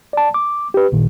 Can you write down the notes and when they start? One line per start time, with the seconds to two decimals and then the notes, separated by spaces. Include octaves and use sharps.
0.13 D5 A5
0.34 D6
0.74 G4 B4
0.92 A1 A#2 D#3